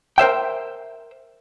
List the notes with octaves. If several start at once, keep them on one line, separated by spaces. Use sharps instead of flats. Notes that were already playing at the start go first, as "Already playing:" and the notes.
A#4 C5 E5 G5